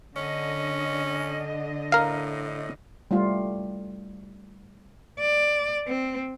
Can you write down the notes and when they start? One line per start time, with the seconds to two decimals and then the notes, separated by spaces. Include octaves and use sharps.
0.16 D3 C#4 D#5
1.92 A2 A#4 F5
3.11 G3 A3 F4
5.20 D5
5.87 C4